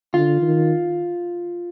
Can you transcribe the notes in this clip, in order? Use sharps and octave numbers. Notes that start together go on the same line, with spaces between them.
D3 F4
D#3